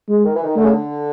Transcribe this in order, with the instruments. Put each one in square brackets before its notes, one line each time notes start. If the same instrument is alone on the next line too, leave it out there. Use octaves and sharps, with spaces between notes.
[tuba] G#3
[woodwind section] D#3
E3
D#3
[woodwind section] D3 [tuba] A3
[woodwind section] C#3
D3